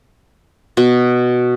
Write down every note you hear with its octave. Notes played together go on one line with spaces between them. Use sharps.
B2